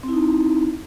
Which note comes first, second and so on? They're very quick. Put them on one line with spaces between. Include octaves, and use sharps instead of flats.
C4 E4 D#4